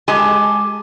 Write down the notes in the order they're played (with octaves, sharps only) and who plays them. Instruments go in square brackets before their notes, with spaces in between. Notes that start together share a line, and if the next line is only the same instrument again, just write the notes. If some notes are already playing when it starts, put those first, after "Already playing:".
[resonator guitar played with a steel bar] G#3 G4 G#4 G#5 A5